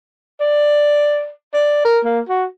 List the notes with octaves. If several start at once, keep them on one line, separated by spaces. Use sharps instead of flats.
D5
D5
A#4
A#3
F#4